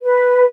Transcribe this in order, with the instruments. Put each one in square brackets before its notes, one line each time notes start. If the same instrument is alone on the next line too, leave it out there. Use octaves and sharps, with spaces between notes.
[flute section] B4